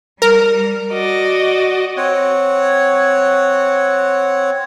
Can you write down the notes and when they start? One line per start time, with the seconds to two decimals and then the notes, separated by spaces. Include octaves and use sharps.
0.22 G3 A#4
0.93 F#4 D5 D#5
1.97 C4 C#5 F#5